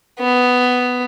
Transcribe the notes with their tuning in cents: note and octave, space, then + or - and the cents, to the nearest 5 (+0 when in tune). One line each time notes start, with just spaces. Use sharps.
B3 +10